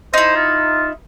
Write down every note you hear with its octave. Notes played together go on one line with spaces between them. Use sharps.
D#4 E4 C5
F4